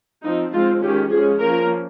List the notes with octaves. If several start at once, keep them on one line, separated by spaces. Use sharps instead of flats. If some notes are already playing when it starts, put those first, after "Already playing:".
F3 C4 D#4
F3 G#3 C4 F4
D#3 G#3 C#4 G4
F3 G#3 C#4 G#4
F3 A#3 C#4 A#4